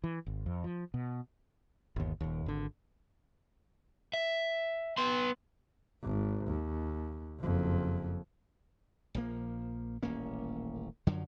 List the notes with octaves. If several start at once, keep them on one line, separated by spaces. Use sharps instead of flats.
E3
G#1
F2
F3
B2
G1 D#2
D#1 D#2
G#1 D3
E5
B3 C6
G#1
D#2
F#1 F2
A#1 F3 A#3
D#1 A1 A#3 C#4
F#2 D3 F3 F#3